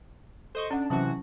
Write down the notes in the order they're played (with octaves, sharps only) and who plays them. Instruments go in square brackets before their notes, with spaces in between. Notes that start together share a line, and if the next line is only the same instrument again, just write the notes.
[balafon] A4 [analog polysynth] C5 D#5 C#6
[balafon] C#4 F#5 [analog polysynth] D4
[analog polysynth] C3 E3 F#4 [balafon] F#3 C#4 A5